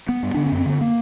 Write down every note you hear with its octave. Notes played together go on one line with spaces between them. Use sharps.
B3
G2
D3 D4
C#4
F#2
C4
D3 B3
A#3